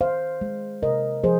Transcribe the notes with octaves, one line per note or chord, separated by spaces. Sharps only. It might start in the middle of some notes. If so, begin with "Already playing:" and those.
D#3 C5 F5
G#3
C3 A#4 D#5
F3 G#4 C5